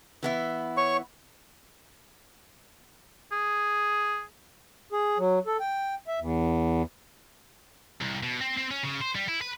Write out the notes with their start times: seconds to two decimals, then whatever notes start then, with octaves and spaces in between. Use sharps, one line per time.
0.23 E3 B3 E4
0.77 C#5 C#6
3.32 G#4
4.93 G#4
5.18 F#3
5.47 A4
5.60 G5
6.07 E5
6.20 E2
8.01 C2
8.23 B2
8.41 C4
8.57 C4
8.71 C#4
8.83 C#3
9.01 C5
9.15 G3
9.28 E4
9.41 B4